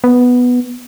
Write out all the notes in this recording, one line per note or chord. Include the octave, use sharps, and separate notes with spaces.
B3